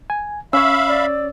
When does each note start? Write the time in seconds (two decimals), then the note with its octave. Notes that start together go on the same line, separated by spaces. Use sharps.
0.10 G#5
0.53 C#4 C#5 E5 F5 B5 E6
0.88 D5